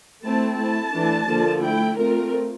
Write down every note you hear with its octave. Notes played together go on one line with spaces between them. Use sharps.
A3 C4 E4 A5
A3 E4 A5
E3 A3 D4
D3 F3 A#3 F4
A3 E4 G5
A3 C4 F4 A#4